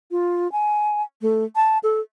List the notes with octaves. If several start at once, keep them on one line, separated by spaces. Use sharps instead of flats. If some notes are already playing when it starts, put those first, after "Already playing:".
F4
G#5
A3
A5
A4